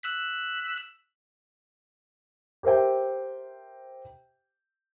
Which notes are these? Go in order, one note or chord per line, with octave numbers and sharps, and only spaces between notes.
E6 F#6 B6
G4 A#4 C5 E5 G5